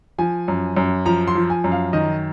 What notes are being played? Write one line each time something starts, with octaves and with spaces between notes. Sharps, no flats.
F3 G#5
F#2
F#2
F3 A#5
C6
F3
G#5
F#2
F5
D#3 D#5